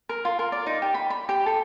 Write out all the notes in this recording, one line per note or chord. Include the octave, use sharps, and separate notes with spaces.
A#4
F4
A#4
D5
D#4
G4
B5
B5
G4
A4